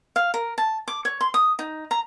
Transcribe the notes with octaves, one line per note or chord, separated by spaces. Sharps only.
F5
A#4
A5
D6
C#5
C6
D#6
D#4
A#5